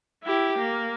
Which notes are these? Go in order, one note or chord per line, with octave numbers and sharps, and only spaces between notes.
E4 G4
A#3